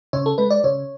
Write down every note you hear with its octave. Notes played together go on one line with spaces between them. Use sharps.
C#3 C#5
A4
G#3 B4
D5
C#3 C#5